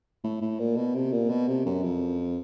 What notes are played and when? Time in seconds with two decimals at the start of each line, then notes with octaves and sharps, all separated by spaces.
0.24 A2
0.42 A2
0.60 A#2
0.77 B2
0.95 C3
1.12 A#2
1.30 B2
1.48 C3
1.66 F#2
1.83 F2